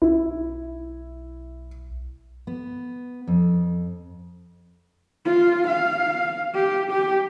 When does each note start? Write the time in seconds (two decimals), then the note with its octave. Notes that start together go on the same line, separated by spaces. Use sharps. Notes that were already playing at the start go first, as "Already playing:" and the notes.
0.02 B1 E4
2.47 B3
3.27 F2
5.26 F4
5.67 F5
6.54 G4
6.91 G4